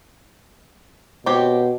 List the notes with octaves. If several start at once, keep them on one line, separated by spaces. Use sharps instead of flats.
B2 C4 G4 C#5